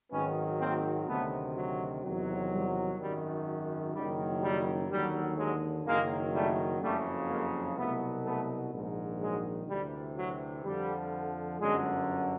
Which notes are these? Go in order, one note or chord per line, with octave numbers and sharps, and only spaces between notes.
G#1 G#2 D#3 F#3 B3 C#4
A#3 C4
D2 C3 D#3 F#3 A3 B3
F#3
E2 C3 D#3 F#3
G3
G#1 F#2 D#3 G3
F#1 F#2 D#3 F#3 G3
G3
D#2 D3 F#3 G3
F#3 G#3
F#1 F#2 D#3 F#3 G#3 A#3
G3 A3
F#1 F2 C#3 F#3 G3 A3
G#3 A#3
C2 B2 F#3 A3 B3
A3 B3
A#1 G#2 D#3
F#3 G#3
D2 C3 E3 G3
F#3
F2 D3 F3 G3
G1 F#2 D3 F#3 G#3